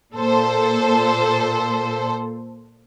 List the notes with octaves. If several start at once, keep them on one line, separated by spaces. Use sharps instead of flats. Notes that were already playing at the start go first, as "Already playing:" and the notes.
A#2 A4 C5